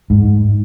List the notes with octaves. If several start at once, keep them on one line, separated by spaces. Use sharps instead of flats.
G#2